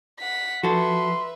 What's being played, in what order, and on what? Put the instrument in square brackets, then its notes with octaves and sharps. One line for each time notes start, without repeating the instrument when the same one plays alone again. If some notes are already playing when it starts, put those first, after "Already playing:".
[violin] F#5 B6
[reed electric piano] F3 [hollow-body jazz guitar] F#4 A4 [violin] B4 E5 [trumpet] C6